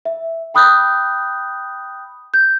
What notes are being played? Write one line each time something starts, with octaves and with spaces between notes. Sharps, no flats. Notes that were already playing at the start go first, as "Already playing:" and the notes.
E5
G5 B5 D#6 F#6 G6
G6